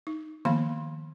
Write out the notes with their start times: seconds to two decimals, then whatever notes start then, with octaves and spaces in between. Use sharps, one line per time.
0.07 D#4
0.45 D#3 F3 A#3 B3 F5 B5